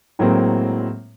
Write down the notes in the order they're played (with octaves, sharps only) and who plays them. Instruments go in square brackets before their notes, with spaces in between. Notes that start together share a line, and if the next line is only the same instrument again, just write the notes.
[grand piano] A2 F#3 G#3 A#3 C4